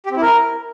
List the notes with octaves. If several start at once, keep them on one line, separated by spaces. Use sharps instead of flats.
G4
C4
E4
A#4